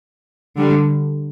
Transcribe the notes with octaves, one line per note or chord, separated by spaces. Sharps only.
D3 G3